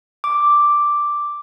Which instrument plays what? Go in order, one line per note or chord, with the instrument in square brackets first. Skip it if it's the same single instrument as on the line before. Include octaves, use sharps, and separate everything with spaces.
[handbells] D6